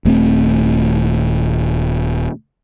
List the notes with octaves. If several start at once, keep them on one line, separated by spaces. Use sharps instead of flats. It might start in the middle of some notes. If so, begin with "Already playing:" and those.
D#1 A3 C4